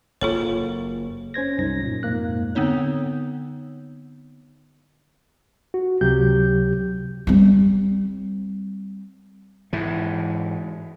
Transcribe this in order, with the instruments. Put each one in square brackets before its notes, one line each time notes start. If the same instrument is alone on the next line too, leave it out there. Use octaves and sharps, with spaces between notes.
[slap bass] F#1 A#3 [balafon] F4 A4 C#5
[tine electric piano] C#4 C5 G#6 A#6
C2 F#2 D#4 A#6
A#2
F2 G#2 A#3 F#6
[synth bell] D3 B3 C4 D#4 C#5
[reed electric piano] F#4
C#2 C3 F#3 G4 G6
[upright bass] G3 C4
[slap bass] G#2 E3